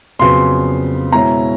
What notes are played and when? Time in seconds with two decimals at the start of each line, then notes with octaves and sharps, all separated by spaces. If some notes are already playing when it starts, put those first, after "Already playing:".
0.19 F2 C#3 F#3 B3 C6
1.12 B2 G#3 C#4 E4 A#5